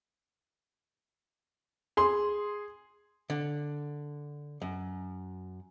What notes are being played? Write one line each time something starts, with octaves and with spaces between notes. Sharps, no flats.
G#4 C6
D3
F#2